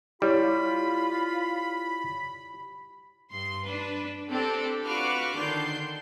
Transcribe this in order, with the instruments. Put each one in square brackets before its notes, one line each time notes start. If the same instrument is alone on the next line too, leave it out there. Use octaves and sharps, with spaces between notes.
[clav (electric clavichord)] G3 [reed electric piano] E4 C#5 [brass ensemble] F4 [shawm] B5
[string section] G2 C6
D4 B4
C4 D4 G4 A4
F4 F#4 B4 C#6 D6 F6
D3 D#3 D4 C6 G6